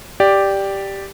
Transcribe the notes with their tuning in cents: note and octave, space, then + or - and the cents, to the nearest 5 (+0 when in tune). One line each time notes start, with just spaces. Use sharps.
G4 +0 D5 +0